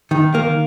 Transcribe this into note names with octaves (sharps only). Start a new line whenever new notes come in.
D#3
A#3